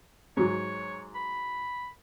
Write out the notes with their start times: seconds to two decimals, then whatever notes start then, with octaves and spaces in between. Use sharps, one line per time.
0.37 G#2 F#3 C#5
1.15 B5